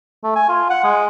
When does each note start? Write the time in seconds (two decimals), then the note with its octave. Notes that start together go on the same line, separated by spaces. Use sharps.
0.24 A3
0.35 G#5
0.49 F4
0.70 F#5
0.84 G#3